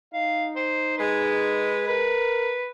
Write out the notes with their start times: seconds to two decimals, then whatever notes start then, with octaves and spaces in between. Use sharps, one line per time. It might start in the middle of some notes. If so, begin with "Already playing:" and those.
0.14 D#4 F5
0.56 C5
0.98 G#3 B4
1.87 A#4 B4